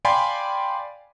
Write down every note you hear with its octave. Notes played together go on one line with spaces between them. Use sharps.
D5 F5 G5 G#5 B5 C6